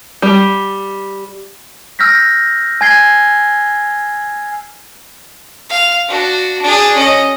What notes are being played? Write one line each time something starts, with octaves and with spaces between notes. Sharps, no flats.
G3
E6 F6 G6 A#6 B6
G#5 G#6 C7 G7
F5
D4 F#4
D4 G#4
C#4 D#5